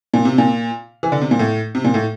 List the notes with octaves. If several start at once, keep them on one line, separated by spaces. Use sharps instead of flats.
A#2
C3
A#2
E3
D3
C3
A#2
A2
C3
A#2
A2